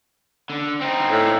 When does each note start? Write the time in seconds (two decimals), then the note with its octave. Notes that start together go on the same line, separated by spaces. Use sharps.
0.50 D3
0.81 C4 D#4
1.10 A2